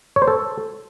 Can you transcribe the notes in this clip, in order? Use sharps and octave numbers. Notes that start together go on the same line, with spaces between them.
C#5
C5
A4